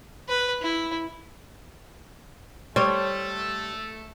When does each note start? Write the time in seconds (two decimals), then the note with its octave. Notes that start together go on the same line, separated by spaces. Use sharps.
0.28 B4
0.62 E4
2.76 G3 A3 A4 C5 C#5